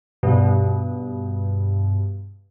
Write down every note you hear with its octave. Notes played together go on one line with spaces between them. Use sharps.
G2 B2